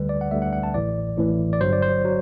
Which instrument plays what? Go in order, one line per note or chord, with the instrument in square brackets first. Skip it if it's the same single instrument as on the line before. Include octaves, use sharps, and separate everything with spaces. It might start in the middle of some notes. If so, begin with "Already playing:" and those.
Already playing: [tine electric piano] D2 D3 G3 B4
D5
F#5
D2 D3 G3 E5
F#5
F#5
A5
A1 A2 E3 D5
A1 A2 E3
D5
G1 G2 F#3 C5
D5
C5
F#3